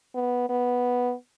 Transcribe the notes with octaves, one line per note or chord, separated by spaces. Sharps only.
B3
B3